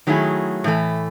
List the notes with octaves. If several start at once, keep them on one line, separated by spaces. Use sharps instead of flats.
D#3 F#3 A3 E4 G#4
A2 E3 A3